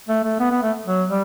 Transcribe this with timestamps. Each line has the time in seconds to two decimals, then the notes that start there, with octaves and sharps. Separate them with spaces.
0.08 A3
0.24 A3
0.40 B3
0.51 B3
0.63 A3
0.86 F#3
1.09 G3